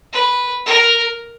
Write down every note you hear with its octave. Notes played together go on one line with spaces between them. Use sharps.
B4
A#4